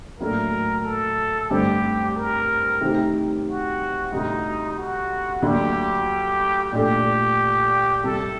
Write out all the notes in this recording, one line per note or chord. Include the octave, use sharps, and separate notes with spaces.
A2 F#3 A#3 D4 A4 A#4
A4
G2 D3 A3 C4 G4
A#4
C3 D#3 A3 C4 G4
F#4
D2 C3 G3 D#4
F#4
D2 D3 F#3 A#3 D4 G4
A#2 A3 D4 G4 A4
C2 C3 G3 A4